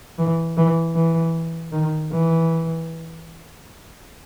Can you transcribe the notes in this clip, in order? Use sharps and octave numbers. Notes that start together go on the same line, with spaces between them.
E3
E3
E3
D#3
E3